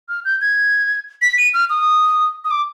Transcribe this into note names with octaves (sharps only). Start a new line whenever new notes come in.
F6
G6
G#6
B6
D#7
F6
D#6
D#6
D6